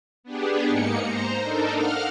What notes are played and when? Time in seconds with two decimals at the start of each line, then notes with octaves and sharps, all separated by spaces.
0.23 B3 D4 G4 G#4
0.66 G#2 A#3 D#4 C#7
1.01 C5 A#5
1.41 D4 D#4 A4 A#4
1.71 F5 F#5 F6